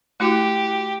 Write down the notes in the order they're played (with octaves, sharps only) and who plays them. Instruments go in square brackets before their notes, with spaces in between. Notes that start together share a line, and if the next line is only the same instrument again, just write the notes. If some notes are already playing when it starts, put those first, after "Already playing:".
[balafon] A3 E4 F#4 [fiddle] G4